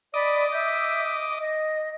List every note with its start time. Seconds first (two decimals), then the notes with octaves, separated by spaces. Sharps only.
0.14 D5 D#5 B5 D6
0.51 E5 G6
1.39 D#5